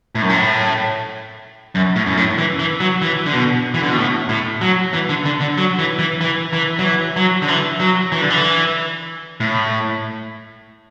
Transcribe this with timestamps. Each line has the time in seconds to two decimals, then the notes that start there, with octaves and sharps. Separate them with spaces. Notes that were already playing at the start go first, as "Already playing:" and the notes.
0.15 A2
0.22 F#2
0.29 A2
1.75 F#2
1.96 A2
2.06 F#2
2.17 A2
2.38 E3
2.59 E3
2.80 F#3
3.02 E3
3.26 D3
3.34 B2
3.74 E3
3.83 D3
3.90 B2
3.97 A2
4.29 A2
4.61 F#3
4.94 E3
5.09 D3
5.25 D3
5.41 D3
5.58 F#3
5.79 E3
5.99 E3
6.21 E3
6.53 E3
6.79 F#3
6.84 E3
7.16 F#3
7.42 D3
7.48 E3
7.80 F#3
8.12 E3
8.21 D3
8.30 E3
9.40 A2